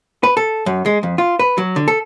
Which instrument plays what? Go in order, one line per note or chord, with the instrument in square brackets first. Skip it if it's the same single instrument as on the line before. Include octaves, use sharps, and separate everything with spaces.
[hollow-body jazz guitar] B4
A4
F#2
G#3
F2
F4
B4
F#3
D3
A4